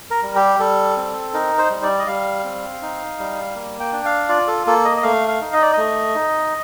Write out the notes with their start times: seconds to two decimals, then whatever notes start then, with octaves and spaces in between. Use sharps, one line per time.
0.11 A#4
0.23 G3
0.35 G4
0.59 G3 A4
0.97 C4
1.34 D#4 A#4
1.58 C5
1.70 G3
1.83 D5
1.99 D#5
2.07 G3 F5
2.45 C4
2.82 D#4
3.19 G3
3.56 A#3
3.80 G5
3.93 D4
4.05 F5
4.29 F4 D5
4.47 A4
4.67 A#3 A4
4.85 D#5
4.97 D#5
5.03 A3 F5
5.28 F5
5.41 D#4
5.53 D#5
5.62 D5
5.73 A3 D#5
6.15 D#4